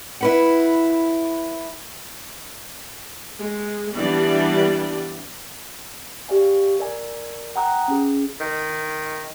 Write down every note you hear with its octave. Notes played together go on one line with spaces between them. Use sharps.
E4 B4 F#5
G#3
E3 G3 B3 D4 D5
G4 D5 F5 G#5
A#4 D5 G#5
F#5 G5 A#5 D#6 F#6
C#4 G#4
D#3